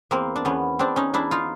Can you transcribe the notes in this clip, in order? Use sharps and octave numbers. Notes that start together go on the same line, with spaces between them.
E2 A#3 C4
D4
E2 B3 C#4
E2 C4 D4
C#4 D#4
E2 D4 E4
D#4 F4